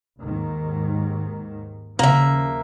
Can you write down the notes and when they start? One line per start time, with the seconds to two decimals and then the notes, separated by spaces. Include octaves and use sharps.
0.20 D#2 G#2 D#3
1.99 D#2 C#3 F3 A#3 E5